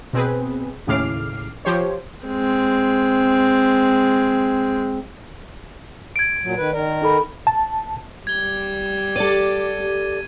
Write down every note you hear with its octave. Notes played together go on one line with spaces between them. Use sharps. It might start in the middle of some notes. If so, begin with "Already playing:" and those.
B2 C4 G#4 B4
D#2 A2 C#3 D6 F6 C7
F3 G4 C5 C#5
G#3 C4
G#6 D7
A#2 F#3
D#3 B4
D#3 A#4 D5
D#4 A4 B5
A5
G3 G#6 G7
G4 A4 D5 D#7
G4